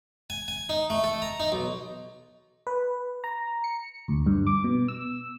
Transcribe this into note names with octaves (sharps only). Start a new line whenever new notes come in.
G#5
G#5
D#4
A3
A4
A#5
D#4
B1
B4
A#5
C#7
D2
G2
D6
B2
E6